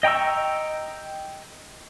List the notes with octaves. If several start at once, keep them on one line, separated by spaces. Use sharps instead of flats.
D#5 G5 A#5 C#6 E6